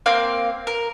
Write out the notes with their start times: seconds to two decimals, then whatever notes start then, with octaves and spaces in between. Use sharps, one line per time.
0.06 A#3 C4 F5
0.67 A#4